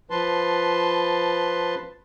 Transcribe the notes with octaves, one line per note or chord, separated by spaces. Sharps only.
F3 B4 A5 C6